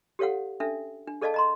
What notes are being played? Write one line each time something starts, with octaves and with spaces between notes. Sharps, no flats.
G4 A4 C#5 F5 F#5
C#4 D4 A4 E5
D4
G#4 A4 D5 D#5 F5 A5
D#5 A#5 C6